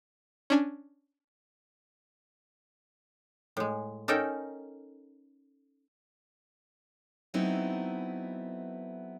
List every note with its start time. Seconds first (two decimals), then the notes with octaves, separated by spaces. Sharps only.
0.50 C#4 D4 G#5
3.57 A2 G#3
4.08 C#4 D#4 A4 A#4 G5
7.34 F#3 A3 B3 C4 D#4 E4